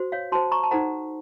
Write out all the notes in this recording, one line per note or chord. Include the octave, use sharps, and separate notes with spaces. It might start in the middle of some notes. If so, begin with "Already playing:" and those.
Already playing: F#4 C5
C#5 F5
F#4 C5 A5 C6
A#5 C#6
A5
D#4 A4 C5 F#5 A#5